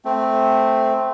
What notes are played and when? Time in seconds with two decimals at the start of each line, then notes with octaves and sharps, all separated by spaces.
0.05 A3 C4